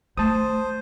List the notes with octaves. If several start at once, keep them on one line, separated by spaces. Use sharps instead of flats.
A3 C5 A5 D#6